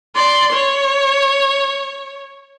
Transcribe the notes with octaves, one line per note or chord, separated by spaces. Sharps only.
D5 C6
C#5